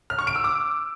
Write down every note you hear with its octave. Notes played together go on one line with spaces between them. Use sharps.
F6
C#6
D7
E6
D6